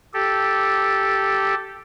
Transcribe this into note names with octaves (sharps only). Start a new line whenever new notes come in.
G4 A4